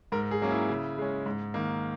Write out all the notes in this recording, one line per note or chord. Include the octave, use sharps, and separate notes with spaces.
G#2 A#4
G#4
F#3 A#3 C#4
E4
C#3
G#3 C#4
G#2
D#3 A#3